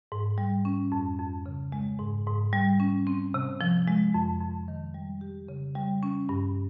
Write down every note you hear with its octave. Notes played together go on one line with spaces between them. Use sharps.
G#2
G3
C#4
F2
F2
C#3
G#3
G#2
G#2
G3
C#4
C4
C3
F3
G#3
F2
F2
D#3
G3
G4
C#3
G3
C#4
G2